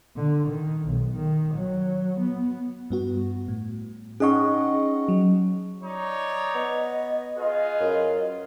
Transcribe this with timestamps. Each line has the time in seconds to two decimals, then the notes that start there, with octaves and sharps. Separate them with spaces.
0.16 D3
0.48 D#3
0.85 B1
1.16 D#3
1.55 F#3
2.20 B3
2.90 G2 B3 F#4
3.48 A2
4.20 C#4 D#4 G#4 D#5 F#5 C#6
5.08 F#3
5.83 D#4 C#5 D5
6.55 B3 D#5
7.38 F4 G#4 B4
7.80 F#2